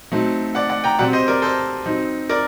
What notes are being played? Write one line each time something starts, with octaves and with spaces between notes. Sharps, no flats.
F#3 A3 C4 D#4
D5 F#5
D5 F#5
G5 A#5
C3 F#3 C4 D5 F#5
C5 D#5
A#4 D5
A4 C5
F#3 C4 D#4
A#4 D5